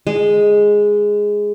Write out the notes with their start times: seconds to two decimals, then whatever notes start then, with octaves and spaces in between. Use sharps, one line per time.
0.07 G#3